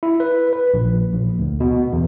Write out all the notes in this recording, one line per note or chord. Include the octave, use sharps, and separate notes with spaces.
E4
B4
B4
A#1
A#1
D2
B2
E2